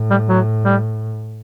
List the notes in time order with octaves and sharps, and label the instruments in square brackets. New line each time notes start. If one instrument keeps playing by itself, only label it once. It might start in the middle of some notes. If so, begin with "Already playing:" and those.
Already playing: [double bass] A2
[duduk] G3
F#3
G3